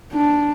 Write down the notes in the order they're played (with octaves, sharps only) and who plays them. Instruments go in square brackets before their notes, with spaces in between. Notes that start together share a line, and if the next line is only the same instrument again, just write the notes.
[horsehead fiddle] D4